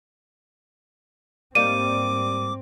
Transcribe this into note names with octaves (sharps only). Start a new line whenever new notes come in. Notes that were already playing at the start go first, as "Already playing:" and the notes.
G#2 G3 A#3 C4 D#4 D6 D#7